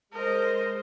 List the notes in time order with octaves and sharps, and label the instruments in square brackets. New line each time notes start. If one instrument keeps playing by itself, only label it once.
[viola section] G#3 C5 [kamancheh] A#4 D#5